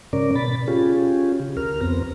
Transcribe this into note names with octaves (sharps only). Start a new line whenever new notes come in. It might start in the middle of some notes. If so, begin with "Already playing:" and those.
G#2 C#3 C#4 A#4 D5
B2 B5 A6
C#4 F4 G4 G#4
C#3
D2 A#4 F6
F2 B3 C4 A#5